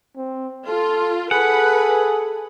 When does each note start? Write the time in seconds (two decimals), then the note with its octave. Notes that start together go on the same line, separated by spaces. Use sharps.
0.16 C4
0.68 F4 A4
1.31 G#4 A4 B4 F#5